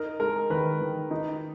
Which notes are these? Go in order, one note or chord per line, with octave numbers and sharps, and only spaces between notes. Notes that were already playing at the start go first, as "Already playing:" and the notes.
Already playing: D#4 A#4
G#3 A#4
D#3 B4
D#3
D#4